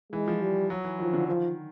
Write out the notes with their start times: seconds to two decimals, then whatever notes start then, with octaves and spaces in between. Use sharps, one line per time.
0.13 E3 G#3
0.28 F3
0.42 G3
0.70 F#3
0.84 E3
0.99 D#3 F3
1.13 D3
1.27 D#3 F3